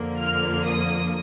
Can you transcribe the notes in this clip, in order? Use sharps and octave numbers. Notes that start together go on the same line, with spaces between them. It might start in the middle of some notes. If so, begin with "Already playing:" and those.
Already playing: F2 D3 F3 A#3
F6
D#6